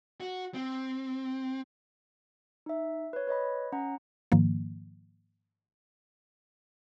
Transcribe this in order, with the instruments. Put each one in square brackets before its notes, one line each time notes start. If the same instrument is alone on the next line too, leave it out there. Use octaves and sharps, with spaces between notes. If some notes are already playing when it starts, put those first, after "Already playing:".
[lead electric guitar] F#4
C4
[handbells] D#4 E5
B4 C#5
B4 C#5 D#5 B5
C#4 F#5 A#5
[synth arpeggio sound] G#2 D#3 F3 A#3